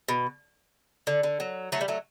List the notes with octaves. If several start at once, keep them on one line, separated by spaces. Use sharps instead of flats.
B2
D3
D3
F#3
F#3 A3
G3
F#3 A3